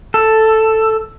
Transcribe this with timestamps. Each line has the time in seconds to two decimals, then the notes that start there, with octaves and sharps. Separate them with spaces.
0.14 A4